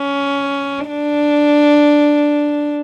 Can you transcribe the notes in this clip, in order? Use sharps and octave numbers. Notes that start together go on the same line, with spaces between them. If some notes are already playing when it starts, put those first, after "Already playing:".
Already playing: C#4
D4